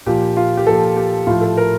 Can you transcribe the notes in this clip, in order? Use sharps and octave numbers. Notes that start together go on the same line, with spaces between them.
A#2 F3 G4
F4
G4
A#2 F3 A4
G4
A2 F3 F4
A4
A#4